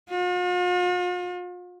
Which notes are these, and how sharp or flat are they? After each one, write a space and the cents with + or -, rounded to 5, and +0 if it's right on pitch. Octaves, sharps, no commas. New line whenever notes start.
F4 +45